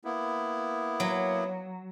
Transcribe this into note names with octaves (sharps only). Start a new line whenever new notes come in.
A#3 B3 E4
F#3